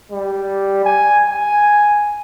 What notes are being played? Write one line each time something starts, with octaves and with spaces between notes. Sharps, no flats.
G3
G#5
G#5